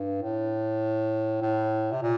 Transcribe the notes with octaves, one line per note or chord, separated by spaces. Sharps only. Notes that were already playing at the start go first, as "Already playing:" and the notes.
Already playing: G2
A2
A2
C3
A#2